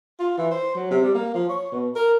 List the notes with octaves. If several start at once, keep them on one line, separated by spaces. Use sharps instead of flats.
F4
E3
C5
F#3
C3
G3
A#3
F3
C#5
B2
A#4